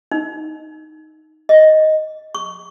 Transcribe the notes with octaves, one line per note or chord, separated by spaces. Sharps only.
D#4
D#5
C#6